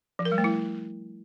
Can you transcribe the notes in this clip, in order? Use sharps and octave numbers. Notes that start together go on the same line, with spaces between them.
F3
A#4
G3
A3
E4